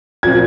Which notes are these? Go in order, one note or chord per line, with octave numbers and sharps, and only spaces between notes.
A#2 F3 C4 G#6